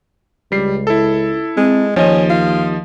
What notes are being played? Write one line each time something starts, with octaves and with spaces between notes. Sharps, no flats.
C#2 G3 C7
E4 A4
G#3 C4
D#2 F3 C#4 D#5
F4